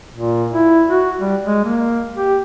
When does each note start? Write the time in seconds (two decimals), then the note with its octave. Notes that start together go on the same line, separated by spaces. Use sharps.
0.14 A#2
0.51 E4
0.87 F#4
1.18 G3
1.45 G#3
1.64 A#3
2.16 G4